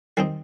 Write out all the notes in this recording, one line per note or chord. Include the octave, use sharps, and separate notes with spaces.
D#3 G3 C4 D#4